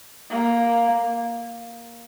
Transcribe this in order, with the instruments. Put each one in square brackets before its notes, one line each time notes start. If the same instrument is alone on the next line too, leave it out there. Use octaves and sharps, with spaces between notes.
[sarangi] A#3